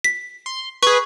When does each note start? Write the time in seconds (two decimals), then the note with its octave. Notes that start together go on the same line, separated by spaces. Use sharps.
0.04 B6
0.46 C6
0.83 G#4 B4 C#6